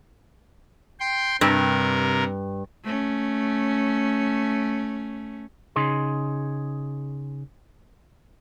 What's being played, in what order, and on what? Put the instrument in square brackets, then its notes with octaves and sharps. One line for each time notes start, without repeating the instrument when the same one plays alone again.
[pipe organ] G5 C6
[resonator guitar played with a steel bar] G2 [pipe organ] C3 A#4
[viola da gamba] A3 C#4
[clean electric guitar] C#3 D#4 G#4 C6